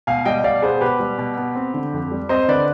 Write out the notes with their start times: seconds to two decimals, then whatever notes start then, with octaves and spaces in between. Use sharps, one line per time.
0.07 B2 F5 G#5
0.25 G3 D#5 G5
0.44 B2 D5 F5
0.62 B3 G#4 C5
0.81 B2 G4 B4
1.00 G3
1.18 B2
1.37 B3
1.55 C4
1.74 D3
1.93 F2
2.11 G3
2.29 C4 C5 D#5
2.48 D3 B4 D5